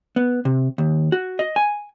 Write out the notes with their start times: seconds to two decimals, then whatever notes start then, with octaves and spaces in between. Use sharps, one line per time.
0.16 B3
0.45 C3
0.78 D#2
1.12 F#4
1.39 D#5
1.56 G#5